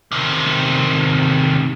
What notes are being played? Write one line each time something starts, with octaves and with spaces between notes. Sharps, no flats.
C3 D#3